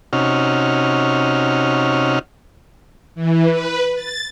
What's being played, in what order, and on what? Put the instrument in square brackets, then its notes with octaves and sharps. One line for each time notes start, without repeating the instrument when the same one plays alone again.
[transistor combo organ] C3 C#4 D#4 F#4 F6
[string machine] E3
B4
A6